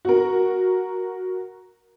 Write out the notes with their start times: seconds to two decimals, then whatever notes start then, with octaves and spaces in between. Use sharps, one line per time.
0.05 F#4 A#4